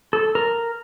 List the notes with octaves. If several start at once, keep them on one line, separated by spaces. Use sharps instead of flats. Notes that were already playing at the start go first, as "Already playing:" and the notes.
A4
A#4